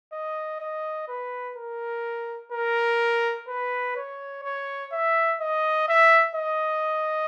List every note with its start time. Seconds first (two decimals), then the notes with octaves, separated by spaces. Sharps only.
0.13 D#5
0.60 D#5
1.08 B4
1.56 A#4
2.52 A#4
3.48 B4
3.96 C#5
4.44 C#5
4.92 E5
5.40 D#5
5.88 E5
6.35 D#5